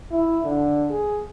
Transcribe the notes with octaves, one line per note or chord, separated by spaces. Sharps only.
E4
D3
G#4